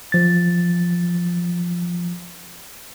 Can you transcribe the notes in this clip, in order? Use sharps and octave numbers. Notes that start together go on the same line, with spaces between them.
F3 A6